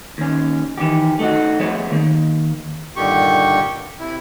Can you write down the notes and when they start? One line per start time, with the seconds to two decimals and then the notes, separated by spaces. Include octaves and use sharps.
0.18 D#2 C#4
0.78 D#3 E3 G4
1.19 A3 D#4 F#4
1.59 F3 A3 B3 G#4 C#5
1.92 D#3 A#3
2.96 G2 A#2 D3 D#3 G4 C#6
3.99 C3 E4